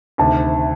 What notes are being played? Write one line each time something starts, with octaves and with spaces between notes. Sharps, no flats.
D2 C3 D#3 A5